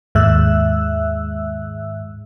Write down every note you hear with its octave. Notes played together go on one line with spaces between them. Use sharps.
D#2 G#2 E5 E6 F#6